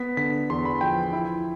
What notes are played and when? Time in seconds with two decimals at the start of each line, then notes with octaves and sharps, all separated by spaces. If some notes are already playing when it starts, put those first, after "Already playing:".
Already playing: B3 B6
0.17 D3 B6
0.50 E2 C6
0.65 B5
0.81 F3 G5
1.13 E4